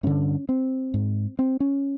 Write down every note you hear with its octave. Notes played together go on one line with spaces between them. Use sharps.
G2 D3 C#4
C4
G#2
C4
C#4